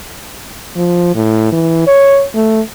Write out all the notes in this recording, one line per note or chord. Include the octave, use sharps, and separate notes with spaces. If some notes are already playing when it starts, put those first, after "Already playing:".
F3
A2
E3
C#5
A3